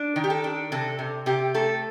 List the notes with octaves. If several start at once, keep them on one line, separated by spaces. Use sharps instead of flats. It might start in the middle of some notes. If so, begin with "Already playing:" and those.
Already playing: D4
D#3
G4
A4
D4
C3 A4
C3
C3 G4
A3 A4